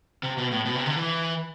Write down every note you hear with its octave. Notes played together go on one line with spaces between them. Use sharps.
C3
B2
A2
B2
C3
D3
E3